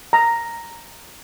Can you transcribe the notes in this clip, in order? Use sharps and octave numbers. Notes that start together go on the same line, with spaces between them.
A#5